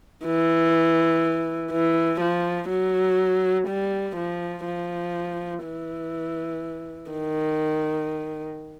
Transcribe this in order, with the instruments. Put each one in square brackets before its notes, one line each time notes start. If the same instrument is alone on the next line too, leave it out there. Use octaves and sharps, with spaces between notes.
[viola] E3
E3
F3
F#3
G3
F3
F3
E3
D#3